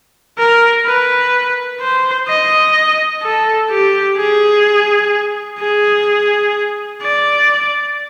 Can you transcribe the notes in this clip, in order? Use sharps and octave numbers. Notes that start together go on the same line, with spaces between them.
A#4
B4
C5
D#5
A4
G4
G#4
G#4
D5